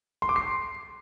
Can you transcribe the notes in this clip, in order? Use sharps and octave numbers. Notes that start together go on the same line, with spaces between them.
C6
D6
C7